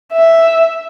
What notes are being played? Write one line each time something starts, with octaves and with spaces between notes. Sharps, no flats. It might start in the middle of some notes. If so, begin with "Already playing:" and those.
E5